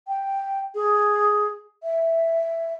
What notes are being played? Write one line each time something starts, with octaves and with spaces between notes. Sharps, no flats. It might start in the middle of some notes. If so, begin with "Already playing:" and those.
G5
G#4
E5